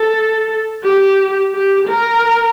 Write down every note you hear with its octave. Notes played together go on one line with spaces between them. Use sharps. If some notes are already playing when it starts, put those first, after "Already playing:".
Already playing: A4
G4
G4
A#4